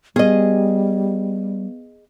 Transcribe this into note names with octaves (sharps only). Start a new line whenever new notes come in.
G3 B3 G#4 D#5